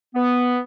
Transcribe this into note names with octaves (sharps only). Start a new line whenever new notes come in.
B3